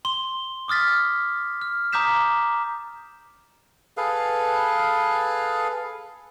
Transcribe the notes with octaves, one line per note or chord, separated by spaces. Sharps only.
C6 G7
D6 D#6 F6 A6 B6
F6
A#5 D6 D#6 G6 B6 E7
G#4 A4 B4 F5